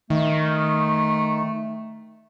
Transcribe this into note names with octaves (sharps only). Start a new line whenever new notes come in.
D#3 A3